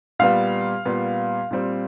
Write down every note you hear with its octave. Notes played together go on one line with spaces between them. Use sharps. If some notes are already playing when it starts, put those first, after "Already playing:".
A#2 G3 B3 F5
A#2 G3 B3
A#2 G3 C4